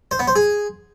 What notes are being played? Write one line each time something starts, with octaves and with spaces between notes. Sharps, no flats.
C5
B3
C5
G#4